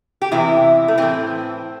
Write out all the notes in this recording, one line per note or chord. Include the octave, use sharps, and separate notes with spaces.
G4
E2 C3 E3 E4
A3
A2 E3 C4